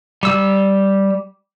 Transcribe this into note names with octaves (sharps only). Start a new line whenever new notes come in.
G3 E6